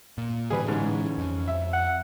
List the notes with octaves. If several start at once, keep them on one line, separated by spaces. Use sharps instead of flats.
A#2
A2 D3 E3 G3 G#4 B4
G#2 C#4
F2
E5
F#5